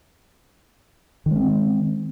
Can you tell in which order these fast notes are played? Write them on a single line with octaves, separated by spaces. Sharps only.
D#3 G#3 C#4 C4